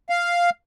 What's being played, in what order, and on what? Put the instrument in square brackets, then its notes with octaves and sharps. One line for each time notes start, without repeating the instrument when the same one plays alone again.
[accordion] F5